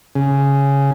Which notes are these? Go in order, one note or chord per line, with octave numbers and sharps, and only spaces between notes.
C#3